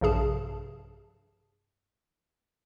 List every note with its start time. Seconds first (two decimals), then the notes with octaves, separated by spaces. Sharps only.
0.01 A#1 G2 C3 G#4 A5